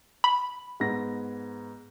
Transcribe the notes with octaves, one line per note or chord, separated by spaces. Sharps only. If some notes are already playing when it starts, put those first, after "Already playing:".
B5
G#2 B3 A#6